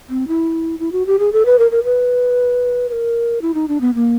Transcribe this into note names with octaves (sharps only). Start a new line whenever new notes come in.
C4
E4
E4
F#4
G4
G#4
A4
B4
A#4
A#4
B4
B4
A#4
E4
D#4
D4
B3
A#3